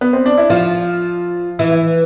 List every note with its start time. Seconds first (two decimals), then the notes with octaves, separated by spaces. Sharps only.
0.01 B3
0.13 C4
0.26 D4
0.38 E4
0.50 F3 F4
1.59 E3 E4
1.71 E4